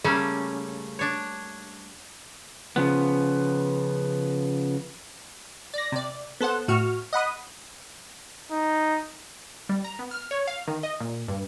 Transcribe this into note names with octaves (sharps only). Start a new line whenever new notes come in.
C#3 G3 A3 A#3 C#4
D4 C#5
C#3 F3 B3
D5 A#6
C3 D5
B3 A4 C5 F#5
A2 F#4 C#6 F6
D#5 F#5 B5 D#6
D#4
G3
A#5
B3
F6
C#5
F5
D#3
D#5
A#2
G2